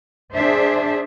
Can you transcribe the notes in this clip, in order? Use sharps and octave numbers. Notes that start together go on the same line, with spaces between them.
D4 G#4 C5 E5